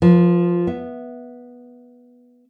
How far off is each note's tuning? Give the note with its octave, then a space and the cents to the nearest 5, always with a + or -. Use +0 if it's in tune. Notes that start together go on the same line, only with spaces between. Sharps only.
F3 +0 B4 -40
B3 -10 E5 +0